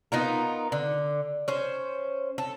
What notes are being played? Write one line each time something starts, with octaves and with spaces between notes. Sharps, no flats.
B3 D#4 F4 A#4
D3
C#4 C5
A4